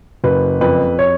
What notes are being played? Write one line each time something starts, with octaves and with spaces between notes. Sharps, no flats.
F#1 B4
F2 B4
C#5